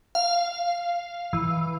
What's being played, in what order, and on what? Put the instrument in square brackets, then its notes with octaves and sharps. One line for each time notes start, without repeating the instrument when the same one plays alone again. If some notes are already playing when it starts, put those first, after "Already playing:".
[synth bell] F5
E3